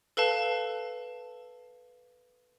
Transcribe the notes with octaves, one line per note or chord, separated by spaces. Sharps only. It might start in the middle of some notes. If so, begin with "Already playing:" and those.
A4 B4 F5 A5